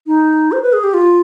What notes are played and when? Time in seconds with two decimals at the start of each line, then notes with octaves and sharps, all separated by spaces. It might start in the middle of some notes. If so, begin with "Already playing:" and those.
0.07 D#4
0.52 C5
0.62 B4
0.73 G#4
0.84 G4
0.94 F4